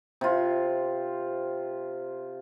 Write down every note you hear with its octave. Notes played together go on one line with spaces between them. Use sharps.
C3 F4